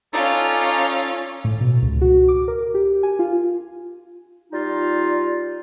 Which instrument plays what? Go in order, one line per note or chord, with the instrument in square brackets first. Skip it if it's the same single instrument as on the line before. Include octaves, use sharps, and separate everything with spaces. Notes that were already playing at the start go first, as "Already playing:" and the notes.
[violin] C#4 F4 [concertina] D#4 A4 D5
[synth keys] A2
B2
C#2
F#4
D6
A#4
G4
G#5
F4
[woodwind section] G3 D#4 F4